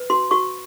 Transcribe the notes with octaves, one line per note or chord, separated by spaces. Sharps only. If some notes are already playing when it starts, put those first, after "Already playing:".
Already playing: B4
F#4 C6
F#4 C#6